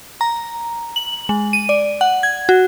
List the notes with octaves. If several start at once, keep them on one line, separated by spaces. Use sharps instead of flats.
A#5
F#7
G#3
D#7
D5
F#5
G#6
F#4